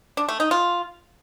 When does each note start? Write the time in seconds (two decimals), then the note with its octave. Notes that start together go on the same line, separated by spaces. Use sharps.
0.17 D4
0.29 A3
0.40 D#4
0.51 F4